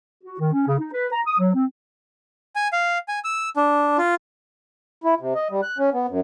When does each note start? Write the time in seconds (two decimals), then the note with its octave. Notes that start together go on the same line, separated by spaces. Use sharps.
0.24 F#4
0.39 D#3
0.53 C#4
0.67 C#3
0.79 D#4
0.92 B4
1.12 A#5
1.26 D#6
1.39 F#3
1.55 C4
2.56 G#5
2.73 F5
3.08 G#5
3.24 E6
3.56 D4
3.98 F4
5.04 E4
5.20 C3
5.35 D#5
5.51 G3
5.63 F#6
5.78 C#4
5.93 B3
6.09 F#2